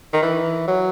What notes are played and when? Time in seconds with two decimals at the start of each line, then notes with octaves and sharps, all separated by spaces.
0.13 D#3
0.22 E3
0.68 F#3